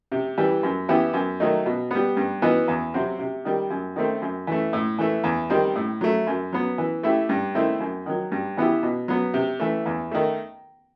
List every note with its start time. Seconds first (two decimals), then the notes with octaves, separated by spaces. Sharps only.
0.12 C3
0.38 E3 G3
0.63 F#2
0.89 E3 B3 E4 G4
1.14 F#2
1.40 D#3 F#3 A3 D#4
1.66 B2
1.91 G3 B3
2.17 G2
2.42 E3 B3 D#4 F#4
2.68 E2
2.94 C3 F#3 C4 F#4
3.19 C3
3.45 D#3 G3
3.70 F#2
3.96 D#3 A3 C4
4.22 F#2
4.47 E3 A3
4.73 A2
4.98 E3 A3
5.24 E2
5.50 D#3 G3 C4
5.76 A2
6.01 F#3 A3
6.27 F#2
6.53 F#3 B3
6.78 E3
7.03 A3 E4 G4
7.29 G2
7.55 D#3 A3 C4 E4
7.80 F#2
8.06 D#3 F#3
8.32 G2
8.57 E3 B3 E4 G4
8.83 B2
9.08 F#3 B3
9.34 C3
9.60 E3 A3
9.86 E2
10.11 D#3 A3